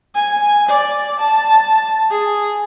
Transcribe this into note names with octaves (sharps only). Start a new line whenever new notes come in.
G#5
D5
A5
G#4